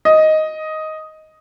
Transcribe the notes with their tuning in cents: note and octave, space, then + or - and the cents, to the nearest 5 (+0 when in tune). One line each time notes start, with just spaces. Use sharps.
D#5 +5